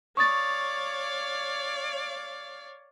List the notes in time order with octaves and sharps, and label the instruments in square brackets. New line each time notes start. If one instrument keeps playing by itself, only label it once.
[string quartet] C#5 D5 F5 [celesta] C#6 D#6 A6